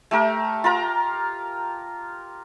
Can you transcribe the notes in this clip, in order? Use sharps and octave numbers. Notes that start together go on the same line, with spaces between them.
A3 G4 A#4
F4 A#4 A#5